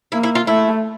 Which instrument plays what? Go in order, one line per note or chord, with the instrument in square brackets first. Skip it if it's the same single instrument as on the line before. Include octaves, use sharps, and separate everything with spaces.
[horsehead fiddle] A#3 [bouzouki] E4
[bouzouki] E4
F4
[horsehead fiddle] A3 [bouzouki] E4